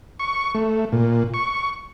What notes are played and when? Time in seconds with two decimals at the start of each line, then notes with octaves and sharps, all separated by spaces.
0.19 C#6
0.55 A3
0.92 A#2
1.34 C#6